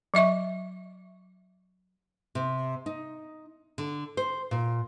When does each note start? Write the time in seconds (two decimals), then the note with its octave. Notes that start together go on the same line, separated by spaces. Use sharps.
0.14 F#3 D#5 E5 C#6
2.35 C3
2.86 D#4
3.78 D3
4.17 C5
4.51 A#2